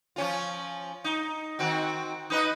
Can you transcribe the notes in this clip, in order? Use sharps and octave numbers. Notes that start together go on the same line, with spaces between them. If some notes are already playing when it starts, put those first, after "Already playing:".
F3 C#4 F4
D#4
D#3 C4 F#4
D#4 B4 D#5